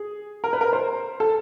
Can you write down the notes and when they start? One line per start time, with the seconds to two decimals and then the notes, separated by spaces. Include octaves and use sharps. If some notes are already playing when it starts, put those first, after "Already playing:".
Already playing: G#4
0.44 A#4
0.53 B4
0.61 A#4
0.73 C5
1.20 A4